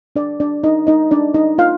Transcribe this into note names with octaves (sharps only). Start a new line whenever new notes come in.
D4 D5
D4 D5
D#4 D#5
D#4 D#5
D4 D5
D#4 D#5
F4 F5